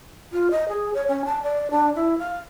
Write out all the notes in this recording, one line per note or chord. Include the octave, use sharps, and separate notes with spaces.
F4
D#5
G#4
C#5
C#4
A5
D5
D4
E4
F5